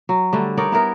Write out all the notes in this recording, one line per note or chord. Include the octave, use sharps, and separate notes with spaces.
F#3
D3 G3 A3
D#4 A#4 C#5 D5
B3 E4 A#4